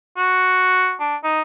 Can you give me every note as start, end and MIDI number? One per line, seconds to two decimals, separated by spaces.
0.17 0.95 66
1.00 1.16 62
1.24 1.42 63